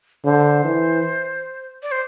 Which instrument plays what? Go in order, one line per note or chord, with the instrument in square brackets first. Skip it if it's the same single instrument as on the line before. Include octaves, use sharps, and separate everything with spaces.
[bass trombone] D3 [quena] C5
[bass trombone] E3
[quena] D5
C5